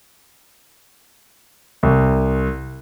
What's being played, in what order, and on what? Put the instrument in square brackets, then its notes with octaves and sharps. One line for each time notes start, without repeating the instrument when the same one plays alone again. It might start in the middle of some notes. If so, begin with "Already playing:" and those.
[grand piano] C2